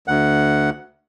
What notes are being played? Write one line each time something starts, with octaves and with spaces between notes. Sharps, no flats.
D2 F#5